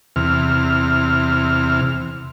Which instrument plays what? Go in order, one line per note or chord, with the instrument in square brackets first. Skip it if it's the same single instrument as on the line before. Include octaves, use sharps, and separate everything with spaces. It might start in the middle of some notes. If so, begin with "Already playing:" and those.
[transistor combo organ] E2 C3 F6